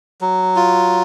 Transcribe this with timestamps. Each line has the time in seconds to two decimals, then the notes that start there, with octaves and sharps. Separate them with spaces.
0.21 F#3
0.56 F4